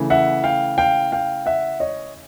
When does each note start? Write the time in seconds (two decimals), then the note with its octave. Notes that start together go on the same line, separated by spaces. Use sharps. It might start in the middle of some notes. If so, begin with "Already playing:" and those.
Already playing: C#3 E3 A3
0.10 E5 F#5
0.44 F5 G5
0.78 F5 G5
1.12 F5 G5
1.46 E5 F#5
1.80 C#5 D#5